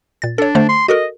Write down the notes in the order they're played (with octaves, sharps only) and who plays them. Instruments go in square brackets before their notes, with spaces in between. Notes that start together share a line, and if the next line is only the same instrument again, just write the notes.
[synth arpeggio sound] A#2 A6
[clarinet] D4 [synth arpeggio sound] A4 C#5
[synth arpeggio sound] D3 A3 C5
[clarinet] C6
[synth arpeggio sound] F#4 A4 A#4 [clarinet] D#5